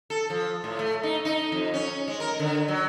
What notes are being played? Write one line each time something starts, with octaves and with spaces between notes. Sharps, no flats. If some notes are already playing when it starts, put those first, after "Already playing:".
A4
F3
A2
A3
D#4
D#4
F2
C#4
G#3
A#4
D3
F#3